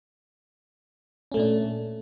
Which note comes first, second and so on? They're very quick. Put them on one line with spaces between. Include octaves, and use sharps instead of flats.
C#4 A3 A#2 D4